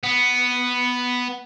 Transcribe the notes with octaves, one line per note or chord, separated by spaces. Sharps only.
B3